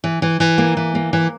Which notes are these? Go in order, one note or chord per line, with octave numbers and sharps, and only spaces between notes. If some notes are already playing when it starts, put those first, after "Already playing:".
E3
E3
E3
A#3
E3
A#3
E3